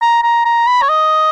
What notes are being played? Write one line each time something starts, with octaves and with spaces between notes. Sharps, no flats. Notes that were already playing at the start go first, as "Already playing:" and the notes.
A#5
A#5
A#5
B5
C#5
D#5